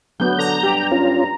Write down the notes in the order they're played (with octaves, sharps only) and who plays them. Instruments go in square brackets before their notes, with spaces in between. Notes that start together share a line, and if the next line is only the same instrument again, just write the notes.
[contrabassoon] D2 [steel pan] F#3 B3 [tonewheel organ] G6
[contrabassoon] D3 [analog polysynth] A#5
[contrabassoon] G2 [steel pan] G4
[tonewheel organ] C#4 F4